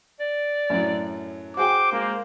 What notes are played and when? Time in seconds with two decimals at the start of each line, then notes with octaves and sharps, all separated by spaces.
0.20 D5
0.70 F#2 A2 F#3
1.57 F#4 G#4 C5 G5 D6
1.93 G#3 A#3